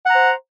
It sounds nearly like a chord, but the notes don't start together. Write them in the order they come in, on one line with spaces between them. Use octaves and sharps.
F#5 A#5 C5